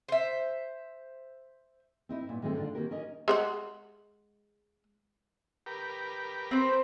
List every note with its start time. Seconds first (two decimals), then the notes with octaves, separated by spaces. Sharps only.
0.09 C5 E5
2.09 C4 D#4 E4
2.29 A#2 B3
2.42 D#3 G#3 A3 C4
2.55 D3 D4 F4
2.75 D#3 A#3 C4 G4 A#4
2.91 C#4 A#4 D#5
3.28 G#3 C5 F#5
5.66 G4 A#4 B4
6.51 C4 C5